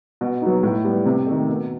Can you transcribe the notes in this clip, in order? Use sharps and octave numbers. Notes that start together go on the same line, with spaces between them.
B2
F#3 B3 D#4
A2
G3 B3
C3
D#3 A3
B2